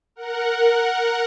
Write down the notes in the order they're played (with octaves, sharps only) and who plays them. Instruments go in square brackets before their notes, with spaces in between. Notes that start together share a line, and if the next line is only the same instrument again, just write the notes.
[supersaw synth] A#4 F#5